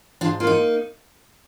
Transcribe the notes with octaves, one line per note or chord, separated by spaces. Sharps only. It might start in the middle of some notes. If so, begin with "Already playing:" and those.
G#2 D4 F4
A#3 F4
D#4